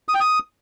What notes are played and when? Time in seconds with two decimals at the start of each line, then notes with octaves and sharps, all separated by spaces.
0.09 D#6
0.14 G5
0.20 D#6